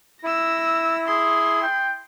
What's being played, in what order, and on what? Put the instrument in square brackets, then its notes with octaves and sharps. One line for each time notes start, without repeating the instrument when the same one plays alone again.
[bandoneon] E4 [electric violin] E6 A#6
[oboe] G#4 [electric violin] C6
[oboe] G5